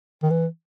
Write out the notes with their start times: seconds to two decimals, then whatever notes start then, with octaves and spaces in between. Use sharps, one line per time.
0.23 D#3
0.30 E3